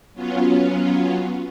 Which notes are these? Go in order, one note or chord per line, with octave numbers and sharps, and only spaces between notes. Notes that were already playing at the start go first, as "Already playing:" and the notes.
F#3 B3 C#4 F4